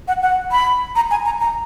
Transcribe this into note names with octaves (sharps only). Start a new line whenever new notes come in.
F#5
F#5
B5
A#5
G#5
A#5
A#5